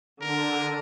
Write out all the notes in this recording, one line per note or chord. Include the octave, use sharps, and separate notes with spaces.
D3 A#4